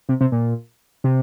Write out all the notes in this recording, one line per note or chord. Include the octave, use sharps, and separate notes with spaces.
C3
C3
A#2
C3